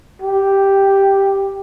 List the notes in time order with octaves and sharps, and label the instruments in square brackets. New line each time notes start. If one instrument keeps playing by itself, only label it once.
[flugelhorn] G4